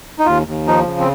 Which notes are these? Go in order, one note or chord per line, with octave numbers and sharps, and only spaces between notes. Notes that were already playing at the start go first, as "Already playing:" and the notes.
D#4
D#2 F4
D#2
F3 D#4
C#3
C4